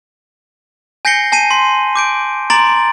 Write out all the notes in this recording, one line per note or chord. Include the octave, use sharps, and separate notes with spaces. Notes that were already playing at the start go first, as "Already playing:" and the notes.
G#5 G6 A#6 C7 C#7 G7
G#5 A5 C7 D#7
C6 B6
D6 G6 D7
A#5 C6 D6 A6 D7 F#7